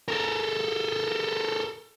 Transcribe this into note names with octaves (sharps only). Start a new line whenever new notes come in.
A4 A#4